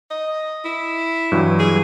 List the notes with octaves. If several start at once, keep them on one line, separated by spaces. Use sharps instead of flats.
D#5
E4
G2 E3 F#3
G#4